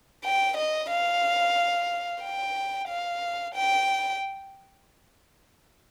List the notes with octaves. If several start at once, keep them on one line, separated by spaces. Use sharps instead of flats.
G5
D#5
F5
G5
F5
G5